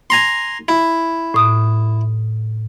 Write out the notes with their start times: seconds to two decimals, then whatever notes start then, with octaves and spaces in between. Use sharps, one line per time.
0.10 G#5 A#5 C6
0.68 E4
1.34 A2 D#6